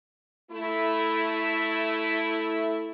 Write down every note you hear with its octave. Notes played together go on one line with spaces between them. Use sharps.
A3 E4